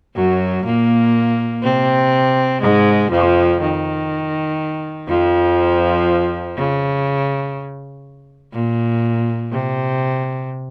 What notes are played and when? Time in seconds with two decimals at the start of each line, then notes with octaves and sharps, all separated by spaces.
0.16 F#2 F#3
0.65 A#2 A#3
1.63 C3 C4
2.62 G#2 G#3
3.11 F2 F3
3.61 D#3
5.08 F2 F3
6.57 C#3
8.54 A#2
9.52 C3